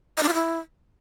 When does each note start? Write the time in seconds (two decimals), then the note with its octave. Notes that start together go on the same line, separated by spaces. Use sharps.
0.17 D#5
0.23 D4
0.28 F4
0.34 E4